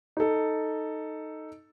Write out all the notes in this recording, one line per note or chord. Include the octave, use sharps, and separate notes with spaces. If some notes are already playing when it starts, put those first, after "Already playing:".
D#4 A4